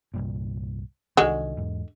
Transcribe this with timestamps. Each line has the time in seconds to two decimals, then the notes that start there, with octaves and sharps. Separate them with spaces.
0.14 C2 G2 A#2
1.17 C2 D3 D#3 G#3 F#4
1.57 E2 G#2